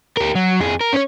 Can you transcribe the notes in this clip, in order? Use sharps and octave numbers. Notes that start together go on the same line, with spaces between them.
G4 A#4
F#3
F2 G#4
A#4
C#4 C#5